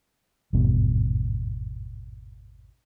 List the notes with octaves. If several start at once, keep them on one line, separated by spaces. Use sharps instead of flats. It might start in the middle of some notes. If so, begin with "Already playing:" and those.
G#1 E2 G2 B2